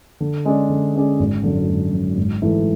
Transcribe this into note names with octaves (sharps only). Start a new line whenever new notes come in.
D3
G#3 C#4 G#4 D5
D3
G#3 C#4 G#4 D5
G#1
F#2 D3
G#1
F#2 D3
G#1
G#2 E3 A3 E4